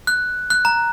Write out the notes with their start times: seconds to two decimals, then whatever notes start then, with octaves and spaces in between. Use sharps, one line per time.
0.07 F#6
0.50 F#6
0.65 A#5